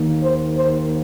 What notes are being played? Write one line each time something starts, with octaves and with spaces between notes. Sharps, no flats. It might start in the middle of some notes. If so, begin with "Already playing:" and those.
Already playing: D#2 D#3 A#3
C5
C5